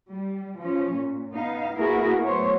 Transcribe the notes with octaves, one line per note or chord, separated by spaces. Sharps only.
G3
F3 C#4
A#2
B3 D#4 F5
A#3 B3 E4 F#4 G#4 A#4
F#3 A3 B3 C5 C#5